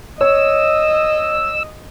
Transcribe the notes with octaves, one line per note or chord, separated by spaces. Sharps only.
C#5 D#5 E6